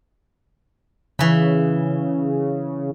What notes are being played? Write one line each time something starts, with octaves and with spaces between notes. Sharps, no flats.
C#3 E3 B5